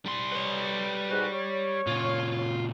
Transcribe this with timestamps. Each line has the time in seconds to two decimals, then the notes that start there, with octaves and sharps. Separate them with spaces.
0.06 G3 C6
0.32 B4 C#5
1.09 G#2 F#4
1.33 C#5
1.87 A#2 C#3 F4